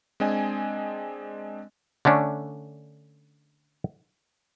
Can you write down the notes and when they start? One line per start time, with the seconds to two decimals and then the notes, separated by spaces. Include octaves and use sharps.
0.20 G#3 C4 D4 D#5 G#5
2.05 D3 A3 C#4 D4